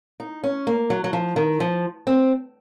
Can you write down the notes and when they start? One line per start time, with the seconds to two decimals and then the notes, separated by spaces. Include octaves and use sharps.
0.20 D#4
0.44 C#4
0.67 A#3
0.90 F#3
1.04 F#3
1.13 F3
1.36 D#3
1.60 F3
2.07 C4